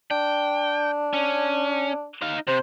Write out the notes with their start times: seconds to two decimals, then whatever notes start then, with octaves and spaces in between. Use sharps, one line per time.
0.11 D4 G5
1.13 C#4
2.22 D#4 F5
2.47 C3 C5